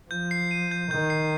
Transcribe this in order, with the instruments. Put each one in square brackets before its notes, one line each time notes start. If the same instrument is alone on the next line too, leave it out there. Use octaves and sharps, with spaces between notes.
[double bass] F3 [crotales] G6
[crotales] C7
D#7
G6
[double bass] D#3 [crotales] G6
[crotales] C7